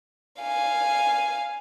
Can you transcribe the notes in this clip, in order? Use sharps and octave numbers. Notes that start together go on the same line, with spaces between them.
F5 G#5